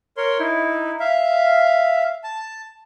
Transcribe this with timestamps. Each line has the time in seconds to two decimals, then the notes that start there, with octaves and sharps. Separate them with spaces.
0.17 A#4 C#5 C6
0.39 D#4 E4
1.00 E5 F5
2.24 A5